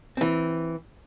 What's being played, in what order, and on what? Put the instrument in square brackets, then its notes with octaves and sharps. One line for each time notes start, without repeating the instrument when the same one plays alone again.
[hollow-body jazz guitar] E3 C4